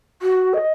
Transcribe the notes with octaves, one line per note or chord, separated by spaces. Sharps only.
F#4
D#5